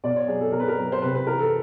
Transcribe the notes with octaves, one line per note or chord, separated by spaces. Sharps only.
B2 D5
C#5
F#3 G#4
A4
B2 A#4
B4
A#4
F#3
C5
C3 B4
B4
E3 A#4
A4